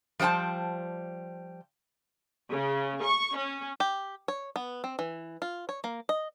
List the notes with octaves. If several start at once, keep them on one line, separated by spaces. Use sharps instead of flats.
F3 G3 C5 G5 A5
C#3
C#6
C#4
G4
C#5
B3
C4
E3
F4
C#5
A#3
D#5